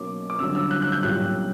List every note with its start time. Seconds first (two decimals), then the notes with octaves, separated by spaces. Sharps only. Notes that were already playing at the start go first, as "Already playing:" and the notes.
Already playing: B1 B2 A#3 C#4 D6
0.30 D6
0.39 G1 G2 D3 F#3 C#4 E6
0.55 E6
0.71 F#6
0.82 F#6
0.92 G6
1.03 B1 A#2 G3 C#4 F#6